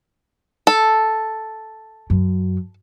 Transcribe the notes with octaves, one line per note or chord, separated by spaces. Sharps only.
A4
F#2